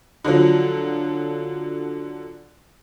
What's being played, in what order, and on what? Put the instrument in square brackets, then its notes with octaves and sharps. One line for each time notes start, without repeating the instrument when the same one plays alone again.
[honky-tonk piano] D3 F3 F#3